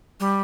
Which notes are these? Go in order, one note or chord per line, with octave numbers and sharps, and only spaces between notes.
G3